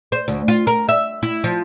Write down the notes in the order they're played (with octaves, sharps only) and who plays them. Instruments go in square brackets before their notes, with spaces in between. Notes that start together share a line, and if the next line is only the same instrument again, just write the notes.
[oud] C5
D2
F4
A#4
E5
E4
F3